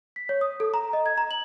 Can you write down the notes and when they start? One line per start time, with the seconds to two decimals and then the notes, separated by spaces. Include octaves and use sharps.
0.16 B6
0.29 C#5
0.41 D#6
0.60 A4
0.74 A#5
0.93 D#5
1.06 G#6
1.18 A#5
1.31 F#7